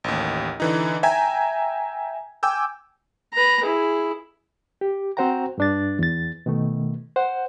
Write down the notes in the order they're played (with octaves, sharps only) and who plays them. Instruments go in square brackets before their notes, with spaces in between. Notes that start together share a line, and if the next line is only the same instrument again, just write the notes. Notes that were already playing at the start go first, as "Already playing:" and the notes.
[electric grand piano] A1 D#2
D3 E3 D#4
E5 G5 G#5 A#5 G#6
G5 G#5 D6 E6 G6
[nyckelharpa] B4 A#5
E4 G#4
[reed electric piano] G4
C4 F#4 C5 F#5 G5 A#5
G2 D4 A6
E2 A6
B2 D#3 A3
C5 F#5